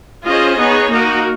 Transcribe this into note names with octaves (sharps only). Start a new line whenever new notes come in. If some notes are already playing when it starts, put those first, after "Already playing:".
C#4 F4 G#4 C5 D#5
B3 D#4 G#4 C#5
A#3 D#4 F#4 A#4